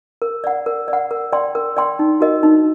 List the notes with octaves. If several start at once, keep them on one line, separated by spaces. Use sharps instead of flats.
A#4
D5 F#5
A#4
D5
F#5
A#4
D5 G5 C6
A#4
D5 G5 C6
D#4
F#4 A#4 D#5
D#4